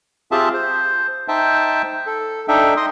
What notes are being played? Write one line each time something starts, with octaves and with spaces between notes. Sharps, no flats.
C4 F4 G4 G#4 E5 A5
C5
D#4 C5 E5 G5 A5
A4
D4 D#4 A4 E5 G5
D#5 C6 D#6